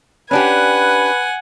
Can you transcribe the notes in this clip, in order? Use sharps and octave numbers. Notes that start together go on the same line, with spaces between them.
C#4 D4 G4 B4 F#5 G#5